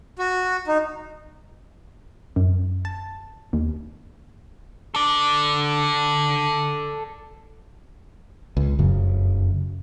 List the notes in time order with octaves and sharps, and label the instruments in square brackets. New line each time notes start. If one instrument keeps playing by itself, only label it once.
[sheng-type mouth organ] F#4
D#4
[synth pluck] F#2
A5
D#2
[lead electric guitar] A4 D5
[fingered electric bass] C#2
F1 F#2 C#3 F#3